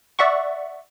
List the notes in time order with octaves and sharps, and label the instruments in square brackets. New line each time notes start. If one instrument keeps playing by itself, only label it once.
[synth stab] D5 E5 F#5 C#6